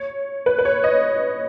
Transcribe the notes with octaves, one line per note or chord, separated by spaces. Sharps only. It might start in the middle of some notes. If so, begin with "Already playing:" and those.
Already playing: C#5
B4
B4
C#5
D#5